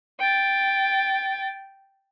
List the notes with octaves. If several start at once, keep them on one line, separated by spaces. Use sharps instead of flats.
G5 A6